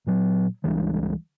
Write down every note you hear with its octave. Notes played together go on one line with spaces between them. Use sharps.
A#2 F#3
C#2 E3 G3 G#3